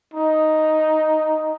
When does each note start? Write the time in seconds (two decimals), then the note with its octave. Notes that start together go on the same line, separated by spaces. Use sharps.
0.14 D#4